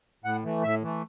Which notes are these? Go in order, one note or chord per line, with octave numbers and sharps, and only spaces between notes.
A2 F#5
E3 A3
A2 E5
E3 A3